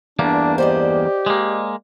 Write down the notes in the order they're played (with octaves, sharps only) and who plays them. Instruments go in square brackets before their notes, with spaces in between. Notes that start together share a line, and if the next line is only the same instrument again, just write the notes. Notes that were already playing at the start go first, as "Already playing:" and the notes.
[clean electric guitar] E2 G2 A#3 [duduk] D4
[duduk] G4 [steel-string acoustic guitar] C5 D5 D#5
[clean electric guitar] G#3 A#3